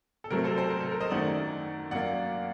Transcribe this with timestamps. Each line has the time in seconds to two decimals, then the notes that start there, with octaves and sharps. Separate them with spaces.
0.24 A4
0.30 C3 F#3 A3 C4 A#4
0.44 A4 C5
0.58 A4 C5
0.70 A#4
0.80 A4
0.91 A#4
1.00 C5 D#5
1.10 F#2 D#3 A3 D5 F#5
1.91 F#2 F#3 A#3 D5 F#5